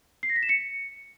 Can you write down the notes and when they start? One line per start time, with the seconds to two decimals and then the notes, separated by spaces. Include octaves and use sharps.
0.23 C7
0.30 A#6
0.36 B6
0.43 E7
0.49 C#7